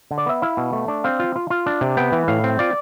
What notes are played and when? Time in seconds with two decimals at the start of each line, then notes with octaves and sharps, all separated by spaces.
0.11 D3
0.18 D5
0.26 B3 E5
0.42 E4 F5
0.57 B2
0.73 A3
0.88 D4
1.04 C4 F5
1.20 F4
1.36 F4
1.50 F4
1.66 D4
1.81 C3
1.97 B3 G5
2.12 E3
2.28 A2 F5
2.44 C4
2.59 F4 D5